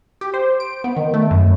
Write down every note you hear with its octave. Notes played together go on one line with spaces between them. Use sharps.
G4
C5
D7
B3
D#3
A3
F#2